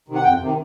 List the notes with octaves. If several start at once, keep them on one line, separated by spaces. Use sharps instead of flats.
C3 D#3
F#5
F2 G5
C3 D#3